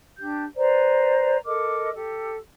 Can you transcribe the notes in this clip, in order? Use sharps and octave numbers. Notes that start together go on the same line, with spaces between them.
D4 G4 G6
B4 C5 D5 A#5
A4 A#4 D#5 D6
G4 A4